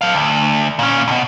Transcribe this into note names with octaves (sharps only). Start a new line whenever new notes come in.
A4 F5
D2
A#2 C#4
D2 B2